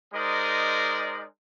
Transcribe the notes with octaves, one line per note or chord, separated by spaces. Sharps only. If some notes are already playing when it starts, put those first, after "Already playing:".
G#3 D#4 A#4 C5 D5 D#5